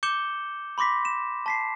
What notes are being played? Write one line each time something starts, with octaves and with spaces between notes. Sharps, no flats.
D6 G6 C#7 E7 G7
B5 C6 D6 A#6 B6
E7
A5 B6 C7